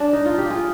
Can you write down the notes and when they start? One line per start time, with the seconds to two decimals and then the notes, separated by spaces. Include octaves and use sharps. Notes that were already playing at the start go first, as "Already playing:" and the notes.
0.00 D4
0.13 D#4
0.26 F4
0.38 G4
0.50 F4 G#4